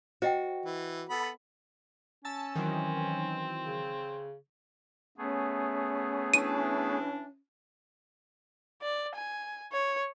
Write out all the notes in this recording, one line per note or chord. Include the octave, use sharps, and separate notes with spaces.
F#4 C5 D#5 G5
E3
B3 A4 B5
C#4 A5 E6 A6
D#3 E3 F#3 C4
C#3
A3 B3 C#4 G#4
E3 D4 D#7
D5
G#5
C#5